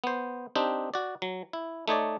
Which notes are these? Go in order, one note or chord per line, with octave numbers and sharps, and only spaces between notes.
B3 C5
C4 D4 D#4 G4
F#4 D5
F#3
E4
A3 D#4 C#5 D5